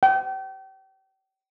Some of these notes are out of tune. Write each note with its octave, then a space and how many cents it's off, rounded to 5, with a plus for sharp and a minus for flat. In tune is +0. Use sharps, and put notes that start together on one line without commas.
G5 -35